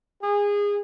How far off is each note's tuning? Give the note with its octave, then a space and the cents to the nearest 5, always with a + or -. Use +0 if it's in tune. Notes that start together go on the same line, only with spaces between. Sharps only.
G#4 -25